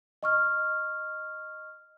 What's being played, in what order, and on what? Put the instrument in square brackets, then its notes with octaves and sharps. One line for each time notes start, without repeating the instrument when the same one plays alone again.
[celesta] D#5 C#6 F6